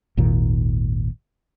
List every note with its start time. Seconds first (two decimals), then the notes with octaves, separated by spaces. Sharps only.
0.17 G#1 D#2 A#2 D#3